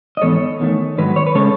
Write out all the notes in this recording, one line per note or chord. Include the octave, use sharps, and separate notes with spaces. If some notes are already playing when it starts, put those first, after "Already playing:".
D#5
G#2 E3 B3 A4 C#5
E2 D#3 A3
G#2 D#3 F#3 B4
C#5
B4
C#3 G#3 C#4 A4 C#5